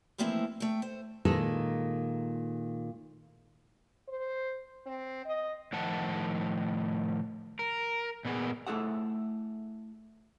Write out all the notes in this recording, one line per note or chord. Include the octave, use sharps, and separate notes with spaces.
E3 F3 A3 A#3 C4 E4
A3 G5
C5
A#2 D#3 G#3 A4
C5
C4
D#5
A2 D#3 F3 F#5 A5
A#4
A#2 B3 G#4
A3 E4 G#4 A4 F#5